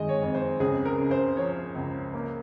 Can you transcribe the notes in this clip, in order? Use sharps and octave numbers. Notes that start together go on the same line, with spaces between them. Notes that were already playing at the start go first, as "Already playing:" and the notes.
Already playing: D#3 G#3 D#5
C#5
F2
C5
C#2 G#4
A#4
C#3
C5
F3 C#5
C#2
A#3